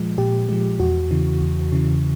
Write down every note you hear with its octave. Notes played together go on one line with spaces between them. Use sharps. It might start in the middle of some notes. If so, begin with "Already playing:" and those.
Already playing: A#2 F3 G#3
A#2 G4
F3 G#3
E2 F#4
C#3 E3
E2
C#3 E3